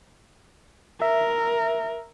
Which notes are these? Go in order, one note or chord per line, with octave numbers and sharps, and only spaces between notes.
A#4 E5